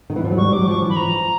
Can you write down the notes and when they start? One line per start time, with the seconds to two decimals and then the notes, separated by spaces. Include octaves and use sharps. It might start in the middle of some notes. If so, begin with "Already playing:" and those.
0.10 D#3
0.16 E3
0.24 F3
0.31 F#3
0.38 G3 C#6
0.52 F#3 D6
0.67 F3 C#6
0.82 E3
0.89 B5
0.96 F3 A#5